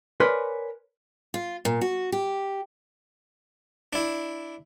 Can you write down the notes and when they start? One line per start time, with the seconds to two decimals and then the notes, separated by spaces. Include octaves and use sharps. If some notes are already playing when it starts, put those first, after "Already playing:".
0.20 A#4 B4 C#5 D5 G#5 C6
1.34 F4
1.65 A#2
1.81 F#4
2.12 G4
3.93 D4 E4